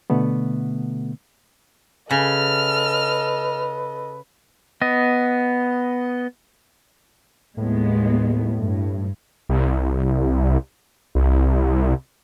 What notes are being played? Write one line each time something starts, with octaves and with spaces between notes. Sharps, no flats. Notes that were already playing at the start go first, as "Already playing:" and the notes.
B2 D3 A3 B3
C#3 A4 B4 D#5 F6
B3 D#5
D#2 A2 G#3 B3
G2
C2
C2